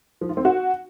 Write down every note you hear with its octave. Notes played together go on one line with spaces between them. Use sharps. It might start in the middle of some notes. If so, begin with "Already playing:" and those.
F3
F4
C4
F#4